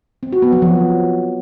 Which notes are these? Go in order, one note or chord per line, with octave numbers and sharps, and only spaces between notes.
C4
F#4
B3
F#3
F3